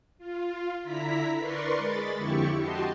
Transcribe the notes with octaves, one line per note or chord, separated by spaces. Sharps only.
F4
D3 E4 A#5 B6
A#4 B4 D5 C6 C#6
G#3 B5 A6
F2 D3 E4 G4 C#6
F#4 G4 D#5 A5 C6